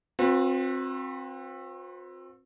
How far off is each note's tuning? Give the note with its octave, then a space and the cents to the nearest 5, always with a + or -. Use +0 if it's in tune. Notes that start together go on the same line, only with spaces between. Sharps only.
C4 +20 F#4 -45 B4 -15